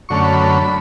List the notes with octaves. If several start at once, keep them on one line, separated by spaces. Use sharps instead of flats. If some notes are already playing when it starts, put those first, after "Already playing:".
F#2 D3 A3 C#4 C#6
B5